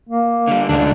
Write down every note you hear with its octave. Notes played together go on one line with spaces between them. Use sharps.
A#3
D3 G3
D2 C#3 G#3 D4